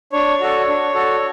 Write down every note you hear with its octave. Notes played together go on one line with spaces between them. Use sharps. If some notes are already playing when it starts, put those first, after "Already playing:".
D4 C#5
F#4 A4
D4
F#4 A4